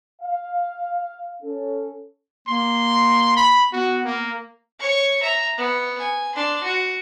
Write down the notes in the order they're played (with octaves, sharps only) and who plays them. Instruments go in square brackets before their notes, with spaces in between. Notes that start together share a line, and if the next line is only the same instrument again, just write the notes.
[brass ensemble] F5
C#4 A4
[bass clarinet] A#3 [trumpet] C6
[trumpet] B5
[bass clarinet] B3 [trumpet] F#4
[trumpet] A#3
[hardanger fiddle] C#5 C#6
E5 A#5
B3
G#5
D4 C6
F#4